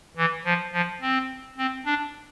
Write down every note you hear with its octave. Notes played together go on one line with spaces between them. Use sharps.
E3
F3
F3
C4
C4
D4